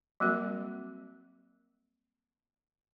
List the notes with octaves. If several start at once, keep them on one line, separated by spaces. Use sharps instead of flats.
F#3 G3 A#3 C4 F#4 A#4